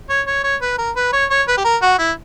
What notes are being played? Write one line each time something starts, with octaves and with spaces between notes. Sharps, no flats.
C#5
C#5
C#5
B4
A#4
B4
C#5
C#5
B4
G4
A#4
F#4
E4